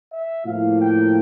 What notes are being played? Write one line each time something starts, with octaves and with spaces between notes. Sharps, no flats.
E5
A2 F3 A#3 F5
G5